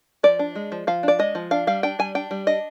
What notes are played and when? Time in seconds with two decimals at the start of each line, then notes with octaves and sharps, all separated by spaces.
0.23 F3 D5
0.39 D4
0.55 G#3
0.72 F3
0.87 F3 F5
1.03 D4 D5
1.19 G#3 D#5
1.35 F3
1.51 D4 F5
1.67 G3 F5
1.83 D4 G5
1.99 G3 G#5
2.15 D4 G5
2.31 G3
2.47 D4 D#5